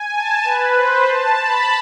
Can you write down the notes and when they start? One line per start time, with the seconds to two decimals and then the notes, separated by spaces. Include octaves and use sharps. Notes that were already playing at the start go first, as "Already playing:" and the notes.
Already playing: G#5
0.13 A5
0.44 B4
0.75 C5
1.06 A5
1.37 B5